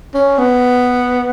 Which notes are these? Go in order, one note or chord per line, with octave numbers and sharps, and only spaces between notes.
C#4
B3